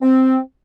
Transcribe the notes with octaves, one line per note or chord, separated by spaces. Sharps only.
C4